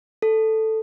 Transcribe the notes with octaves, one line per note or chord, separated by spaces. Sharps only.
A4